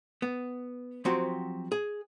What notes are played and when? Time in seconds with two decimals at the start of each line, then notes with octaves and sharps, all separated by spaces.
0.22 B3
1.05 F3 F#3 C4 F#4 G4
1.72 G#4